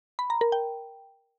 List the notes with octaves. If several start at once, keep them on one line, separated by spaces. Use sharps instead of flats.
B5
A#5
A#4
G5